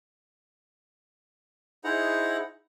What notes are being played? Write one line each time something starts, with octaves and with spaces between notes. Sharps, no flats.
D#4 E4 G#4 C5 F#5 A#5